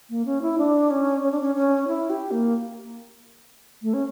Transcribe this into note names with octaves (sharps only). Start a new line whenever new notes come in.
A#3
C#4
E4
D4
C#4
C#4
D4
C#4
C#4
E4
G4
A#3
A3
C#4